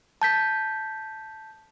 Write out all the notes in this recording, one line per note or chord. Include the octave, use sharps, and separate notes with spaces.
A5 G6 B6